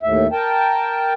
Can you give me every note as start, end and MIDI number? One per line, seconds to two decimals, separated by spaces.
0.03 0.27 39
0.03 0.27 45
0.03 0.27 76
0.32 1.13 70
0.32 1.13 79
0.32 1.13 81